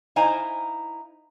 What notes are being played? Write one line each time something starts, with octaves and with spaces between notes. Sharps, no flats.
D#4 E4 C5 F5 G#5 A#5